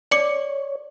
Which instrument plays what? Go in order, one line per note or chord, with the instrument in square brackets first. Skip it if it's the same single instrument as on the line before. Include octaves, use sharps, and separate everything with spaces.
[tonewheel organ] C#5 [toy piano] D5 [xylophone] D6 C#7 F#7